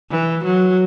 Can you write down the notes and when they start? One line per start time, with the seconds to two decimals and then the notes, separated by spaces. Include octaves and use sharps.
0.10 E3
0.45 F#3